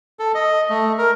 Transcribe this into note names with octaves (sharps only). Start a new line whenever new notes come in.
A4
D#5
A3
A#4